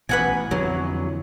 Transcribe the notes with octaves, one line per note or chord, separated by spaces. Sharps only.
A1 B2 B4 F#5 G#5
F2 D3 E3 F#3